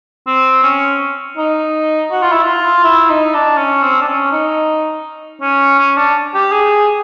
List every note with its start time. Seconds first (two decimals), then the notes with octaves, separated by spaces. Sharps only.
0.27 C4
0.63 C#4
1.37 D#4
2.11 F#4
2.22 F4
2.32 E4
2.43 F4
2.84 E4
3.09 D#4
3.34 D4
3.57 C#4
3.82 C4
4.01 D4
4.08 C#4
4.32 D#4
5.41 C#4
5.79 C#4
5.97 D4
6.34 G4
6.52 G#4